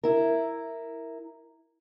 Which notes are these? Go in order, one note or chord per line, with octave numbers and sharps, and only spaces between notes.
E4 A#4